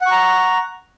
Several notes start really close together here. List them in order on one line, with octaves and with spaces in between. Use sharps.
F#5 C#6 A#5